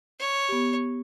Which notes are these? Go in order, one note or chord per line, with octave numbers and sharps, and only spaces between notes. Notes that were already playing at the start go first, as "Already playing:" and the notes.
C#5
B3 G4